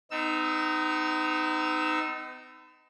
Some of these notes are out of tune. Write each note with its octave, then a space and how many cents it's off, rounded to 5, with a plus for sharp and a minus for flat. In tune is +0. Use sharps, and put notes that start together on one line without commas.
B3 +45 D#4 -5 E6 +5